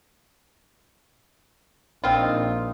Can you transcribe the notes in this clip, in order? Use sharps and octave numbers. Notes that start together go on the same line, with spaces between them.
A#1 C4 D#4 F4